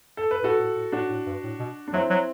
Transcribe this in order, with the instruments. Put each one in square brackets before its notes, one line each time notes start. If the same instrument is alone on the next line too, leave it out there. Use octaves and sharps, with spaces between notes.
[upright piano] A4
B4
[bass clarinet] A2 [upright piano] F#4 A4
[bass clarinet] A2
A2
[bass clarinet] A2 [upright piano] D4 F#4
[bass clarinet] A2
G2
A2
B2
[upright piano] D4
[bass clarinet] F#3 [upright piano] C4 E4
[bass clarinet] F#3